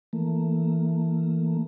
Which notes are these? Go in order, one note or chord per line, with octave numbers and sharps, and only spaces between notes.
E3 A3 A#3